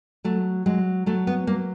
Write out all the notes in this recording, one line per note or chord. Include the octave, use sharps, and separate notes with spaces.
F#3 A3
F#3 G#3
F#3 A3
B3
F#3 A#3